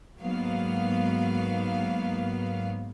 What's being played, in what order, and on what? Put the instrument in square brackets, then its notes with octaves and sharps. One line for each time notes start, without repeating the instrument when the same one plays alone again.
[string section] G#2 F#3 A#3 B3 F5